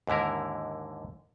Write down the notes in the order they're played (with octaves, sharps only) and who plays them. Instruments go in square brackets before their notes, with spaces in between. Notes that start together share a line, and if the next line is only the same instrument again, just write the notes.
[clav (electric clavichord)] D#2 G#2 D3 E4 A#4